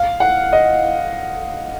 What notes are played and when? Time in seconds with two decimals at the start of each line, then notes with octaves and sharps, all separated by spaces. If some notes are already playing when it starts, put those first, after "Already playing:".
Already playing: F5
0.20 F#5
0.53 D#5